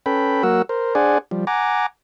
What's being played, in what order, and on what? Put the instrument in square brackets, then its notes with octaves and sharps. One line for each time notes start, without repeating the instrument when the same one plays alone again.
[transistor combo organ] C#4 A4 B4 G5 B5
F#3 A#3 F#4 A#4 F#5 E6
A#4 C5
D4 G#4 C5 D5 F#5 G#5
F3 G3
F#5 G#5 A#5 D6